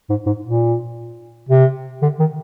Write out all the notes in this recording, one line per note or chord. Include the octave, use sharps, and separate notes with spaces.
G#2
G#2
A#2
C3
D3
D#3